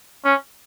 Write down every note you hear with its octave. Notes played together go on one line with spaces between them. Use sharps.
C#4